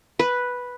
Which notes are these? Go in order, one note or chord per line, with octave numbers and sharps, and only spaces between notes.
B4